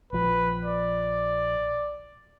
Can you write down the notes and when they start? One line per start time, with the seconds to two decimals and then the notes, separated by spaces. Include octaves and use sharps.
0.13 A#1 F3 B4
0.65 D5